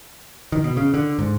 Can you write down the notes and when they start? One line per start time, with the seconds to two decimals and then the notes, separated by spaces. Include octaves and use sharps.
0.52 D#3
0.64 B2
0.77 C#3
0.94 D3
1.19 G#2